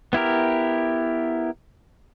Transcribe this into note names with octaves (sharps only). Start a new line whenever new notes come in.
B3 E4 G4 A#4